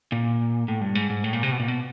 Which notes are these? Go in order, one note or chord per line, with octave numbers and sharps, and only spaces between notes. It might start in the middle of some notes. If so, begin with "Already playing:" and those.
A#2
A2
G2
G#2
G#2
A2
A#2
C3
B2
A#2
B2